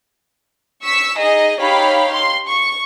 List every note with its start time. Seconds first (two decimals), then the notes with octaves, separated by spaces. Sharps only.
0.83 C#6 E6 B6
1.19 D#4 G#4 D#5
1.61 D#4 G4 C#5 F5 B5
2.13 C6
2.48 C#6